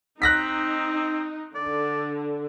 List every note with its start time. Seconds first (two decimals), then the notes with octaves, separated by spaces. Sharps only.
0.22 C4 D#4 F#6 A#6 B6
1.55 D3 D5